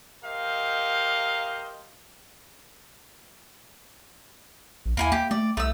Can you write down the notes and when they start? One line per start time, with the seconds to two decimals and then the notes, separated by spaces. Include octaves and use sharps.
0.24 G4 A#4 C5 D#5 F5
4.86 A#1
4.97 D#2 A#3 E4 G#5
5.12 A#3 G4
5.31 A3 D5
5.57 C2 A3 E6